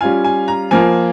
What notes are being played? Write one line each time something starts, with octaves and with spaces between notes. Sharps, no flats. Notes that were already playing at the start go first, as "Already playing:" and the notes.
G3 C#4 F4 G#5
G#5
A#5
F3 A#3 F4 G#5